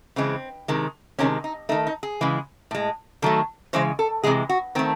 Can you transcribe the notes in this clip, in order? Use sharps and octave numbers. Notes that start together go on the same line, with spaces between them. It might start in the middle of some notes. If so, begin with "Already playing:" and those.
C#3 E3 G#3 C4
C3 D#3 G#3
C3 D#3 G#3 C#4
D#4
D#3 A3 D#4
D#4
G#4
C#3 E3 G#3
A2 G#3
D#3 F#3 A3 A4
C#3 E3 G#3 C5
A4
C3 E3 G#3 G#4
F#4
D#3 A3 C4